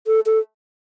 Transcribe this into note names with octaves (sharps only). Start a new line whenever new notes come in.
A4
A4